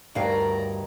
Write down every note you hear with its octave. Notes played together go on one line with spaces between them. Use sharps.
D2 G2 D#3 C#5 D5 F5 A#5